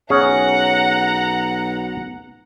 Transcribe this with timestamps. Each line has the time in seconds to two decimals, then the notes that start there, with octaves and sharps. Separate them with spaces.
0.10 B1 C#4 G#4 F#5 A#5